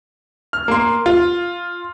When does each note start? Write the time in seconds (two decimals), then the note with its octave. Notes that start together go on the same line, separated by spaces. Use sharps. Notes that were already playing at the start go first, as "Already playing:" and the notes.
0.53 F6
0.68 A#3 C6
1.06 F4